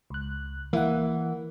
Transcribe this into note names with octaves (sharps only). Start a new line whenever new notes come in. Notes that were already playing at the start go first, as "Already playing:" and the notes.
C#2 F#6
E3 A#3 E4 F#5